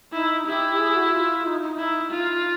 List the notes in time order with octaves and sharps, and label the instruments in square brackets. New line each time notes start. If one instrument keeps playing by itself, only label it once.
[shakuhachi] D#4 [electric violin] E4
[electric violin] E4 [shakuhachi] G4
[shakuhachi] G#4
F#4
F4
D#4
D#4
[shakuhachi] D#4 [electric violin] E4
[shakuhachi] D#4 [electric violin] F4